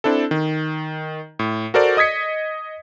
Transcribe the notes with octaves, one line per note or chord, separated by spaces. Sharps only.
C4 D4 E4 A4
D#3
A2
F#4 A4 A#4 C5 D5
D#5 D#6 G#6 B6 C#7